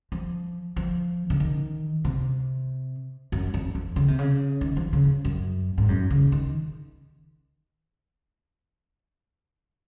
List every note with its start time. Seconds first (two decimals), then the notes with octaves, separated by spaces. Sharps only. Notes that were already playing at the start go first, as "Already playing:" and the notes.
0.12 F3
0.76 F3
1.30 C#3
1.40 D#3
2.05 C3
3.32 F#2
3.54 F2
3.75 F2
3.96 C#3
4.08 C3
4.19 C#3
4.61 D#3
4.77 F3
4.93 C#3
5.25 F#2
5.78 G#2
5.89 F#2
6.10 C#3
6.32 D#3